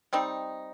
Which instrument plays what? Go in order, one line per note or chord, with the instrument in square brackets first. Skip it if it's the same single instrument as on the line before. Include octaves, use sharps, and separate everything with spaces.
[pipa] G3 C4 D#4